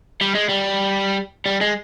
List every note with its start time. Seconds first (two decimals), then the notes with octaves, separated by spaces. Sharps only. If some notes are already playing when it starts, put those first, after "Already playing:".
0.22 G3
0.35 G#3
0.49 G3
1.46 G3
1.61 G#3